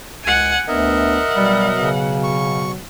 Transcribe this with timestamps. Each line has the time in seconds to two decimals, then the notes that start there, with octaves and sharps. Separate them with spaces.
0.24 C#2 F#5 G#5
0.68 D2 B3 D4 A#4 D#5 E5 F#5
1.36 B2 F#3 G3
1.77 C#3
2.24 C#6